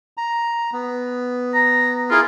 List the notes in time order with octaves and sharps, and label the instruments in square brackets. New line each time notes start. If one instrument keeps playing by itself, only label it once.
[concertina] A#5
B3
[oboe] A#5
[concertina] E4 G#4 A#4 [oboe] F4